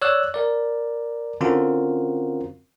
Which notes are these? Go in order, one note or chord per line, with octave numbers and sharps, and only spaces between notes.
C#5 D5 E6 F#6
A#4 D5
D3 C4 C#4 F4 F#4 A#4